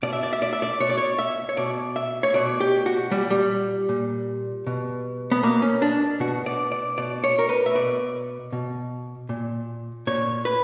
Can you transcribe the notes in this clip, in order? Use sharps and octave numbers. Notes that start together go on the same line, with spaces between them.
B2 D5
E5
D5
E5
D5
E5
D5
B2 C#5
D5
C#5
E5
C#5
B2 D5
E5
C#5
B2 D5
G4
F#4
A#2 G3
G3
A#2
B2
B3
B2 A#3
C#4
D4
B2 F#4
D5
D5
B2 D5
C#5
A#4
B4
E5
B2 D5
B2
A#2
A#2 C#5
B4